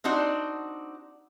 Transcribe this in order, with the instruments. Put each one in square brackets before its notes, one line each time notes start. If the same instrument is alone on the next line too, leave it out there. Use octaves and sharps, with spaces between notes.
[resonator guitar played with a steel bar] C4 D4 D#4 F#4